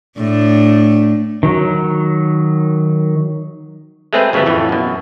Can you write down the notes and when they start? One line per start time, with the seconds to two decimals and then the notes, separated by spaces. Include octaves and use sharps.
0.17 A2 D4
1.43 D#3 F#3
4.13 G#3 A3 C4 G#4 B4
4.33 G1 C#3 F#3 A3 B3
4.46 F2 A2 E3
4.69 F#2 B2